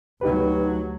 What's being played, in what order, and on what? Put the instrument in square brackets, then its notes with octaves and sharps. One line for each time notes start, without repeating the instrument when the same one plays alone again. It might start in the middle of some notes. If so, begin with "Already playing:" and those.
[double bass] D2 F#3 [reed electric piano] D#4 G4 B4